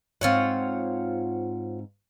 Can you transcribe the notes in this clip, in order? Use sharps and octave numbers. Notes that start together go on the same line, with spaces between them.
G#2 C4 F4 C#5 F#5